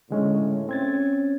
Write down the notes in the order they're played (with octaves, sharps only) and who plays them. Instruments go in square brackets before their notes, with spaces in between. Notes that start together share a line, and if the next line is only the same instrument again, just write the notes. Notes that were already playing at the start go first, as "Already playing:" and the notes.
[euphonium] A2 [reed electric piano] D3 G#3 C#4
[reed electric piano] C4 G#6 A6 [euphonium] C#4